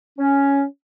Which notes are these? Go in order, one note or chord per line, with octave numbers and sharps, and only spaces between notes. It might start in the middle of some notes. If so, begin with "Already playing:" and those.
C#4